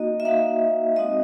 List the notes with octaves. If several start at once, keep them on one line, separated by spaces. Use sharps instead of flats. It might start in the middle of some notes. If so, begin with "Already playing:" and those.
Already playing: A#3 D#4 F#4 D#5
E5
A#3 D#4 F#4 F5
G#3 C4 D#4 F#4 D#5